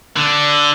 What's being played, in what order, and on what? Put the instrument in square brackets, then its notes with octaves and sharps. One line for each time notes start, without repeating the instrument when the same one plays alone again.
[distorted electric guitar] D3